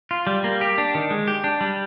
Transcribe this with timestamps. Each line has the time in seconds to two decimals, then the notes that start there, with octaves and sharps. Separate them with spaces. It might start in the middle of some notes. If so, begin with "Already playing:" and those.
0.11 F4
0.27 G3
0.44 A#3
0.61 G4
0.78 D4
0.95 D#3
1.11 G#3
1.28 G4
1.44 D4
1.61 G3